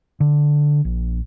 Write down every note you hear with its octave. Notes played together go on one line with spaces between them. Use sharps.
D3
A#1